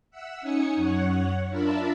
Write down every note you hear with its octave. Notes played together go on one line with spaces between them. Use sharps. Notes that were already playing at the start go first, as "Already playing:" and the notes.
E5 F#5 E6
C#4 D#4 G#5 D#6 C#7
F#2 C#5 F#5
D4 F4 A#4 E5 A5 B5